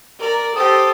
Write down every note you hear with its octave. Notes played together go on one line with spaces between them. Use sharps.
A#4 D5
G4 A4 C5 D#6